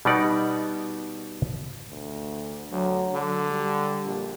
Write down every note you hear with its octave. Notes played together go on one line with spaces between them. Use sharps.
B2 G3 B3 D#4 D5 F#5
D2
D2 F#3
D3
G3
A#1